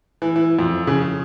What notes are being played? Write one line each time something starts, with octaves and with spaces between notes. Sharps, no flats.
E3
E3
F2
C#3